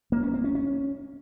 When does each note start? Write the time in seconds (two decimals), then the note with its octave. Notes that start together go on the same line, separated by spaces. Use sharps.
0.12 A#3
0.23 C#4
0.34 C4
0.44 C#4
0.55 C#4